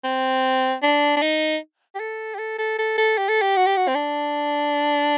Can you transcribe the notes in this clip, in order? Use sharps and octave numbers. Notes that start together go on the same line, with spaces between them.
C4
D4
D4
D#4
G4
A4
G4
A4
A4
A4
A4
G4
A4
G4
F#4
G4
F#4
C4
D4